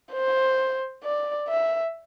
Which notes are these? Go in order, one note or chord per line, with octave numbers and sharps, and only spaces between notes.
C5
D5
E5